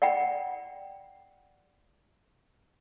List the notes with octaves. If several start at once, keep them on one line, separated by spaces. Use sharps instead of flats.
D5 F#5 G5 B5